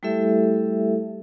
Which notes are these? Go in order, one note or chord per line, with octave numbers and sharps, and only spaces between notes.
G3 A3 E4 G4 A4 E5